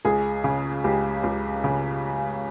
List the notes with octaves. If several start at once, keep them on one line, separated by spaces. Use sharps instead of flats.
C#2 G#4
C#3
C#2 G4
C#2
C#3